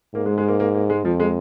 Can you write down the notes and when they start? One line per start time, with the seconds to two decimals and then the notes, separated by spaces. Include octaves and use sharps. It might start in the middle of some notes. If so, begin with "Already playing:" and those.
0.14 G#2 A#3
0.26 G#3
0.38 G#3
0.48 A#3
0.60 A#3
0.74 A#3
0.90 G#3
1.04 F2 F3
1.20 G#3